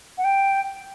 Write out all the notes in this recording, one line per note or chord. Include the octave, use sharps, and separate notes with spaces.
F#5
G5